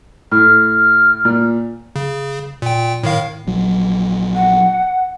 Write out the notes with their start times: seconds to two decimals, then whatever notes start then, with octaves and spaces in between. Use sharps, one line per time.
0.31 A2 F6
1.25 A#2
1.96 C#3
2.62 A#2 G5
3.03 A2 D#3 F5
3.47 A#1 F#3
4.35 F#5